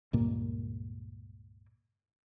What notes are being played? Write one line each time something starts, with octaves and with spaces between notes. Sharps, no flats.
C#2 G2 A#2 A#3